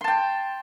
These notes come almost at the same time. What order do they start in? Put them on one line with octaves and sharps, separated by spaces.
C6 A5 G5